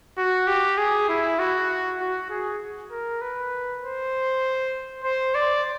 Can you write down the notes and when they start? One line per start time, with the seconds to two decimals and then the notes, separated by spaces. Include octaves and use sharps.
0.17 F#4
0.47 G4
0.78 G#4
1.09 E4
1.39 F#4
2.00 F#4
2.30 G#4
2.91 A#4
3.21 B4
3.83 C5
5.04 C5
5.35 D5